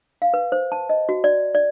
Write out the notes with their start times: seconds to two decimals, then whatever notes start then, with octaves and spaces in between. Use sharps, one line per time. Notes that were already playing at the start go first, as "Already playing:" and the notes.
0.22 F5
0.34 B4
0.52 C5
0.72 A5
0.90 D#5
1.09 F#4
1.24 D5
1.55 D5